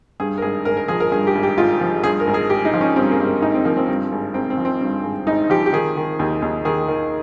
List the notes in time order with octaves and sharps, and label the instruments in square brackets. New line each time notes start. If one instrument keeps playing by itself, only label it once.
[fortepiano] G2 G#4
A#4
G#1 G#4
G#1 A#4
A#4
F3 G#4
A#4
G2 G#4
G4
G#1
G4
G#1 F4
F3
G2 G#4
A#4
G#1
G#4
G#1 G4
D#4
F3
C#4
G2 C4
A#3
G#1
A#3
G#1 D#4
C4
F3 A#3
C4
G2
G#1
G#1 C4
C4
F3
C4
G2
G#1
G#1 D#4
F3 G4
G4
D#3 G#4
D#3
D#2
D#2
D#3 G#4
D#3